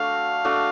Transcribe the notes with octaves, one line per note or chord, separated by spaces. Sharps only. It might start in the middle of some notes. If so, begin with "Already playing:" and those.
Already playing: A3 D4 F#4 F5
A3 D4 F#4